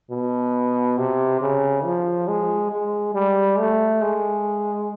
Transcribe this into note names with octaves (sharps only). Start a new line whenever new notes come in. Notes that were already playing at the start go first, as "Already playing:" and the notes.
B2
C3
C#3
F3
G#3
G#3
G3
A3
G#3